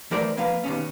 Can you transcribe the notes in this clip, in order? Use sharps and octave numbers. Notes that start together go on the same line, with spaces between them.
E3 A3 A#4 C5 D5
F2 A#3 B4 F5
D#2 B2 C#4